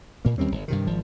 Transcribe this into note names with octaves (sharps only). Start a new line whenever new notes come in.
A#2 A#3
D#2 G3 C4 C#4
G1
G2 C3 D#3
G#1 F3